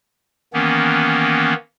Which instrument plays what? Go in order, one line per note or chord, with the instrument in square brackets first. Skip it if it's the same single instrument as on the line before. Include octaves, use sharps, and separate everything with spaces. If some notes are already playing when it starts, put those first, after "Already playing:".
[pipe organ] D#3 E3 A#3 B3 C#4